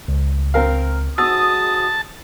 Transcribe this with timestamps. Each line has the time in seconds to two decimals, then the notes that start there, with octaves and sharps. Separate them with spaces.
0.08 C#2
0.54 C4 A#4 F5
1.18 G#2 F#4 A5 D#6 E6